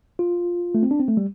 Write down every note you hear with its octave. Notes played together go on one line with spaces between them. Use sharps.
F4
A3
C4
D4
C4
A3
G3